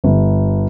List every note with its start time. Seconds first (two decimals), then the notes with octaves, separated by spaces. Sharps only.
0.04 G1